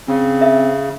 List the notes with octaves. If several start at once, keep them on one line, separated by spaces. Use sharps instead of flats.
C#3 C4
E5